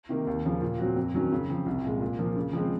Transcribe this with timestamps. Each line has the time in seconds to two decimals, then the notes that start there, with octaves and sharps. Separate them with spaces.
0.09 C3 D#3 A#3
0.27 D#2
0.45 C#3 F3 A#3 C#4
0.62 A#2
0.79 F#3 C4 F#4
0.96 F2
1.14 D#3 F#3 C#4
1.32 C#3
1.50 F3 C4
1.66 C2
1.84 A#2 G#3
2.01 A#2
2.19 F3 A#3
2.37 C#3
2.53 F3 G#3 C4